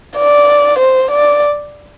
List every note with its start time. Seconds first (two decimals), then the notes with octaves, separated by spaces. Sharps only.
0.17 D5
0.79 C5
1.11 D5